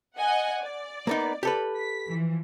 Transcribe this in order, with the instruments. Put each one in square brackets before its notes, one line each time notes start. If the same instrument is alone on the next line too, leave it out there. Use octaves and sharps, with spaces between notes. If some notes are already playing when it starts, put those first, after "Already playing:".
[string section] D#5 F#5 G#5
D5
[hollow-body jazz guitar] A#3 B3 D#4
G4 A4 B4
[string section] B6
E3 F3